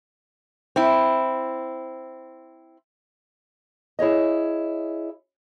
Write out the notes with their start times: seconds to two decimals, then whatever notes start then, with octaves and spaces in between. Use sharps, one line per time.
0.76 C4 E4
3.99 E4 G#4 C#5 D#5